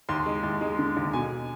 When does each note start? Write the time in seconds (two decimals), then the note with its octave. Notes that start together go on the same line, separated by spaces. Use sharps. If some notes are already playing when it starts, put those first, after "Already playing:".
0.09 D#2 C6
0.26 G#3
0.43 D#2
0.61 G#3
0.79 D3
0.97 D#2
1.13 B2 G#5